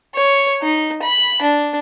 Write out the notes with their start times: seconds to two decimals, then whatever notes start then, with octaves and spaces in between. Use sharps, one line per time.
0.15 C#5
0.62 D#4
1.02 B5
1.41 D4